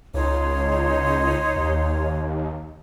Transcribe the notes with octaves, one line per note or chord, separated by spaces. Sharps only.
C#2 D#4 C5 C#5
D#2